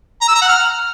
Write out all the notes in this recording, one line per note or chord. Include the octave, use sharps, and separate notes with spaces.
A#5
E6
A#5
F#5
F6